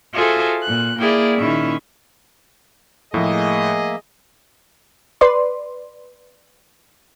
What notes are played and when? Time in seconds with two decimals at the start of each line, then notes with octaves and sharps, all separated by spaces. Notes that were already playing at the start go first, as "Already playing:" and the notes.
0.14 F4 F#4 G#4 A4 C5 E5
0.62 A#2 F#6
1.00 A#3 E4 G#4 D5 G5
1.35 A#2 D#3 C#4 E4 E5
3.14 A2 F3 A3 A#3 G#4 D#5 E5
5.21 B4 D5 C6